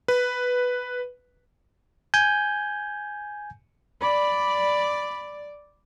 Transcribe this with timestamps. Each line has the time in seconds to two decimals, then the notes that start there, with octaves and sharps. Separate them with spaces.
0.08 B4
2.14 G#5 G6
4.02 D5 B5